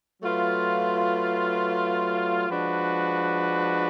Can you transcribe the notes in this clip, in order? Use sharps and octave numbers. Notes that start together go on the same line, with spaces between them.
F#3 A3 F4 B4
F3 G#3 D4 F#4 B4